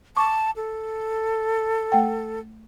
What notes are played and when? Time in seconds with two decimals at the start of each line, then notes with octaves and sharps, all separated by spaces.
0.17 A5 C#6 D6
0.56 A4
1.92 A3 F#5 G5